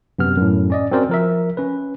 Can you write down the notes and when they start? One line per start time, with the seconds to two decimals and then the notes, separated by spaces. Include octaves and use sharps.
0.19 F#2 C3 B3 F6
0.37 F#2 A2
0.70 C#4 D5 D#5
0.91 C4 C#4 F#4 A#4 C5 D5
1.09 F3 A#4 E5
1.57 C#4 B4